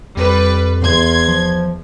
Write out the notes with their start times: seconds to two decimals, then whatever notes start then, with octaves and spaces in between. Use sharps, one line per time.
0.17 F2 G3 B4
0.81 E2 C6 G#6
1.28 F3